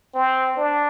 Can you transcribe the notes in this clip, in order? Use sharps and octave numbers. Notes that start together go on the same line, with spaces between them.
C4
D4